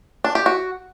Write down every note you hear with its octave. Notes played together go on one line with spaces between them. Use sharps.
D4
G4
F#4